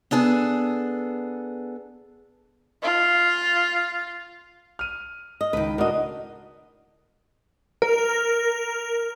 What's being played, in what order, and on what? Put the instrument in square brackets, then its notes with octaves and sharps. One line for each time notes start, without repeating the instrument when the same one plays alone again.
[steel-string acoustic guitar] B3 D4 G#4 A4
[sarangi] F4
[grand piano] F6 D#7
[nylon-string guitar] D#5
[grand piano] C#2 [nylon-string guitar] D#3 B4
[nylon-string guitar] A2 D#5 [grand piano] D4 F#4 A#4
[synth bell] A#4